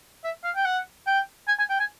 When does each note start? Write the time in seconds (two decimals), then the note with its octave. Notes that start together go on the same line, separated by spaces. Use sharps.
0.24 E5
0.44 F5
0.55 G5
0.65 F#5
1.07 G5
1.48 G#5
1.59 G#5
1.69 G5
1.79 G#5